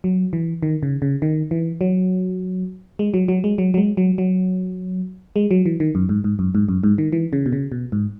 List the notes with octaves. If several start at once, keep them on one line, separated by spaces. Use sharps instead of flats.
F#3
E3
D#3
C#3
C#3
D#3
E3
F#3
G#3
F#3
F#3
G#3
F#3
F#3
G#3
F#3
F#3
G#3
F#3
E3
D#3
F#2
G#2
G#2
F#2
G#2
F#2
G#2
D#3
E3
C#3
B2
C#3
B2
G#2